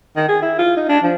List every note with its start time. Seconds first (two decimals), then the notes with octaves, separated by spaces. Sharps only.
0.16 D#3
0.28 G#4
0.42 E4
0.58 F4
0.76 D#4
0.89 D4
1.03 F3